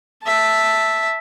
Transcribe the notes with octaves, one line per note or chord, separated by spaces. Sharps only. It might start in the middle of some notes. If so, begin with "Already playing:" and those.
E5 A5